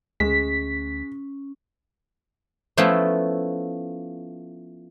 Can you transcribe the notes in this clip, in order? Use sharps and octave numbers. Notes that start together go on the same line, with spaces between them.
D2 G#3 C#4 B6
F3 A3 B3 C#4 E4 F4